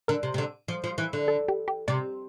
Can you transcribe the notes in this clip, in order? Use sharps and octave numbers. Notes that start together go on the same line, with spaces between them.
D3 A#4
C3
C3
D3
F3
F3
E3
D3
A4
G4
G4
C3 D5